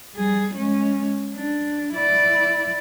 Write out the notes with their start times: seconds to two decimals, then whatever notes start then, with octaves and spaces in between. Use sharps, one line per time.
0.16 G3 G#4
0.55 G#3 C#4
1.35 D4
1.95 E4 D5